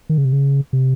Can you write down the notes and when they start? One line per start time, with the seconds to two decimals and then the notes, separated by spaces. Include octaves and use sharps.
0.09 D#3
0.18 C#3
0.25 C3
0.33 C#3
0.73 C3